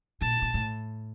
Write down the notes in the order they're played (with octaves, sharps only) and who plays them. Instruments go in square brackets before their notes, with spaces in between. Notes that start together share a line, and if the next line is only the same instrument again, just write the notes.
[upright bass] A#2 [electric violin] A5
[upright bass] A#2
A2